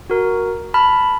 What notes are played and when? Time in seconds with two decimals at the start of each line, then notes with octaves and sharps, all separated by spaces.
0.10 F#4 A#4
0.74 A5 B5 F6